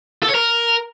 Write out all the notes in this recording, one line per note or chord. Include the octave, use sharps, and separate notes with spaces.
A4
C#5
A#4